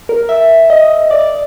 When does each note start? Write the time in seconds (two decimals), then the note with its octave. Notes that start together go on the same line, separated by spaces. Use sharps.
0.09 A#4
0.29 E5
0.70 D#5
1.11 D5